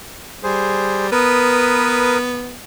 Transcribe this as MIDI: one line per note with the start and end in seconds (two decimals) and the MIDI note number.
0.43 1.07 55
0.43 1.07 68
0.43 1.07 72
1.12 2.57 59
1.12 2.18 70
1.12 2.18 71
1.12 2.18 87